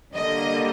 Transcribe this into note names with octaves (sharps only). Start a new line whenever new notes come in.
D3 G3 A#3 D#5